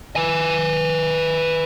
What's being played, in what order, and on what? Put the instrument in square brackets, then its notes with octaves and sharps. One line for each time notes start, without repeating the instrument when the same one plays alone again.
[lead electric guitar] B4 G#5